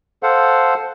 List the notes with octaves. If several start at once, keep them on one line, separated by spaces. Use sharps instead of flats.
A4 C5 F5 F#5